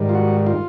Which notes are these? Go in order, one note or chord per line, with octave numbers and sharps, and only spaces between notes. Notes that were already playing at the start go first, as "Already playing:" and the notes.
Already playing: G#2 D#3 G3
F4
F#4
F4